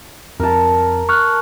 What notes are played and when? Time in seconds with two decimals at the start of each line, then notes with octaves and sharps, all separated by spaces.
0.40 F2 A#4 A5
1.09 C#6 F6 F#6